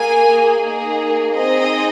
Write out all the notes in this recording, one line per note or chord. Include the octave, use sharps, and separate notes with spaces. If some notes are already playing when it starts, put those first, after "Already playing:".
Already playing: A#3 G#4 G#5
A#3 D#4 G#4
C4 D#4 G#4 D#5